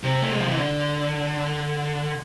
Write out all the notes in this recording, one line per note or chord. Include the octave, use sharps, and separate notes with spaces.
C3
A3
G#3
F3
E3
D3